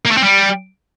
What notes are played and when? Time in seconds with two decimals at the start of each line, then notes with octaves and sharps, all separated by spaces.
0.05 A#3
0.11 A3
0.17 C4
0.23 G3